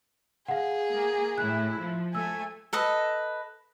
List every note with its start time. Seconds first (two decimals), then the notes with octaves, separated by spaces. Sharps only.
0.48 G#4 F5 F#5
0.91 A#3
1.38 A2 E4 F#6
1.80 F3
2.15 A3 G#5 E6
2.73 A4 B4 D#5